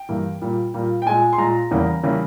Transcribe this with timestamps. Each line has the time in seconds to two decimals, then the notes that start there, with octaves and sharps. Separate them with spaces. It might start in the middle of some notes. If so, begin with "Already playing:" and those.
Already playing: G5
0.09 G2 E3 A#3
0.41 A#2 G3 A#3
0.74 A#2 G3 A#3
1.02 G5
1.06 A#2 G#3 G#5
1.33 C6
1.38 A#2 G#3 A#5
1.71 E2 C#3 E3 G3 A#3
2.03 C#3 E3 G3 A#3